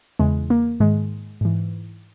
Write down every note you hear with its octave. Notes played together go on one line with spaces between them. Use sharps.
E2 C#3 E3 G#3
A#3
G#2 D#3 G#3
G#2 E3